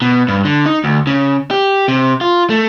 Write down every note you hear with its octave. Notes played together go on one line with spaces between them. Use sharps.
B2
G2
D3
D#4
D2
C#3
G4
C3
F4
A3